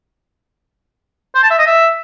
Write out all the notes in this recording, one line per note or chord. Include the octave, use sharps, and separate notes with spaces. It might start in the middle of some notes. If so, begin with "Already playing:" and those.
C5
A5
E5
D#5
E5